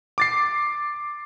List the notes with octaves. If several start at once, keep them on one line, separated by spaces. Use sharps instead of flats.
D6 A6 C7